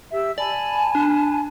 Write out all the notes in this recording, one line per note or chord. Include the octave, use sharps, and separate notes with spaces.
G4 E5 E6
D5 G#5 A5 B5
D4